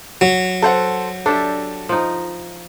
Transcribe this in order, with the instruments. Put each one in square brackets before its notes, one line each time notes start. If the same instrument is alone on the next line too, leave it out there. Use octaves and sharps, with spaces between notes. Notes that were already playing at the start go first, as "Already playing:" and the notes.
[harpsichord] F#3
[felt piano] A4 C5 F#5
[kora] D4 G4 E5 [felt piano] A4
[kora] F3 D#4